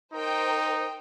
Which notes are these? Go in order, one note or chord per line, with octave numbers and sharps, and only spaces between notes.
D#4 A#4 C5 G5